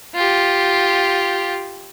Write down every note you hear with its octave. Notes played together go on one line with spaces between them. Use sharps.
F4 G4